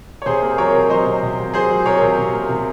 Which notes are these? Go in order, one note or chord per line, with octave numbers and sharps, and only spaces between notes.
C#5
C3 G#4 C5
A#3
F#3 A#4 C#5
C3
F#3 C5 D#5
C3
C3
C3
F#3 G#4 C5
F#3
C3 A#4 C#5
C3
C3
A#3
C3